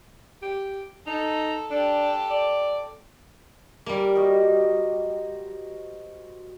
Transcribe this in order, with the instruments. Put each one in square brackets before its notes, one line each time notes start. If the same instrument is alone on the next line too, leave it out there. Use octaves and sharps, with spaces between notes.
[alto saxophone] G4
[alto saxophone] D#4 [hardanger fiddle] A4
[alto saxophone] D4 [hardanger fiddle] G4 A4
[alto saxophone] D5
[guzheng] G3 A#3
[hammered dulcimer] F#4 C5 D#5